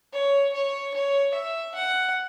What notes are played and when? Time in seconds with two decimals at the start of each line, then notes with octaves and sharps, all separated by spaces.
0.13 C#5
0.53 C#5
0.94 C#5
1.34 E5
1.75 F#5